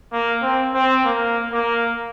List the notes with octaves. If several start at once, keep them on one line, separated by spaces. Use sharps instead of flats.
A#3
C4
C4
A#3
A#3